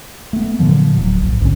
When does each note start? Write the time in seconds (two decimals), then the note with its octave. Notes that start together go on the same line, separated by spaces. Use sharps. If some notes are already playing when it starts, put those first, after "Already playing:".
0.33 A3 B3
0.59 A#2 D3 F3 F#3
0.95 D1 F#3
1.21 A#1 G#2
1.41 B1 D3 C#4